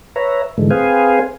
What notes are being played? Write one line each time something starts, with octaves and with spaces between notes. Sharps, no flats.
B4 C#5 E5 A#5
G#2 D3 E3 G#3 A3
C4 G#4 B4 C5 F5 G#5